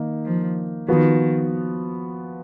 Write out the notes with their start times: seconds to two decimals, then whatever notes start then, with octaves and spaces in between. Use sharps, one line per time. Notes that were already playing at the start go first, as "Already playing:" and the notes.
Already playing: D#3 A#3 D#4
0.24 F3
0.88 D#3 F3 B3 F#4